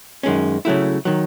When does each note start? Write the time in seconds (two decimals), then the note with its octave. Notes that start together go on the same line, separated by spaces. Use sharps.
0.23 F#2 D#3 G#3 C#4
0.65 C#3 F#3 A3 E4
1.05 D#3 F#3